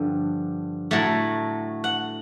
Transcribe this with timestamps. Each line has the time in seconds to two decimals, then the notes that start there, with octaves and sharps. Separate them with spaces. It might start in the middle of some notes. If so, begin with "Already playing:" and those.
Already playing: G2 D3 F3
0.91 A2 F#3 A3
1.84 F#5